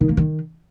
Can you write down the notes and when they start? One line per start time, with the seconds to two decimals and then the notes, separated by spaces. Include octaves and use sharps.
0.01 D#3
0.09 A#3
0.17 D#3